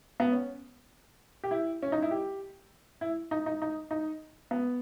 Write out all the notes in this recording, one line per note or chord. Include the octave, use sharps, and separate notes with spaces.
B3
C#4
G4
E4
C#4
D#4
E4
G4
E4
D#4
D#4
D#4
D#4
B3